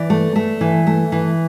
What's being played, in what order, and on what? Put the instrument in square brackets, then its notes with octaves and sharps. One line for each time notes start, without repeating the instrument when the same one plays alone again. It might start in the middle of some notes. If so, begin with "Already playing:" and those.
Already playing: [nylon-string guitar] E3 D5
A3
A3
E3
A3
E3